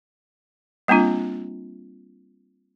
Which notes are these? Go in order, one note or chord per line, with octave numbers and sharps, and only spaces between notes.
G3 A#3 C4 D4 F4